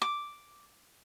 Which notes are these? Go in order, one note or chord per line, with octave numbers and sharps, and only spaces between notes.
D6